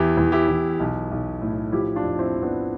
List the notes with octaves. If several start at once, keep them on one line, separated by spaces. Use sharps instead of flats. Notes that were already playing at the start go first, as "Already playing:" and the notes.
Already playing: E2 E4 G4
E2
E4 G4
E2
B1
B1
A2
F3 E4 G4
D4 F4
F2
C4 E4
F2
B3 D4